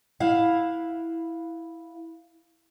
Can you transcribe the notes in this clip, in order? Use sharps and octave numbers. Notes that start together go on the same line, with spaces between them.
E4 F5 F#5